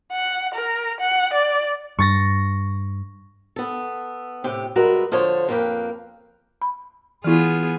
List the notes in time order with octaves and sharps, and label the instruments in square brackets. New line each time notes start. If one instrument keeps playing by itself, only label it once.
[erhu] F#5
A#4
F#5
D5
[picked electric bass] G2 [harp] C#6 A6 A#6
[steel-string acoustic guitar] B3 A4
A2 C3 G4
G3 G#3 F#4 A#4 B4 E5
D3 F3 A4 C5 C#5
F2 A#3 B4 G5
[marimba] B5
[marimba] E3 E4 [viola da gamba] B3 F4 G#4